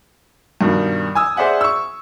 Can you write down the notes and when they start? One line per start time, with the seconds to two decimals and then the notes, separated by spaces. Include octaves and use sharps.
0.61 G2 B2 D#3
1.15 G#5 D#6 E6
1.36 G#4 C5 D5 E5 F#5 G#5
1.61 C#6 E6